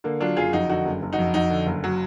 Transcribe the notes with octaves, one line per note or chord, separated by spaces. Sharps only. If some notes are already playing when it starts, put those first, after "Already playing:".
D3 A#3
F#3 D4 F4
F#1 F4 G#4
F2 D#4 F#4
D3 D#4 F#4
F#1
F#1
D#4 F#4
F2
F2 D#4 F#4
D3
F#1
F#3